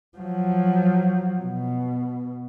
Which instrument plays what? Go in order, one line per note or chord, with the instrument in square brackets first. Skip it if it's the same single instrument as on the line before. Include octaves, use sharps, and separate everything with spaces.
[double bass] F3 F#3
B2